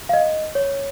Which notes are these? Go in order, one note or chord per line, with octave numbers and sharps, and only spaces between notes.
F5
D#5
C#5